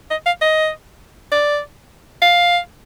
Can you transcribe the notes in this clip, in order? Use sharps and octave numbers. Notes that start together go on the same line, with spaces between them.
D#5
F5
D#5
D5
F5